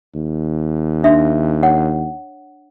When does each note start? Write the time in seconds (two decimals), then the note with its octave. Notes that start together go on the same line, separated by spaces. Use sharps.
0.15 D#2
1.03 D4 E5 C6
1.63 C#5 F#5